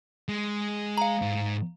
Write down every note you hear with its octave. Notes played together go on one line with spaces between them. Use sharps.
G#3
F5 A#5
G#2